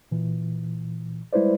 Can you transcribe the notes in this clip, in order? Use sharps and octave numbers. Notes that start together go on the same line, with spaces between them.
A#2 E3
G3 G#3 E4 B4 C5 D5